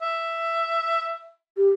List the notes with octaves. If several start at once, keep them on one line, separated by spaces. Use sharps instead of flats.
E5
G4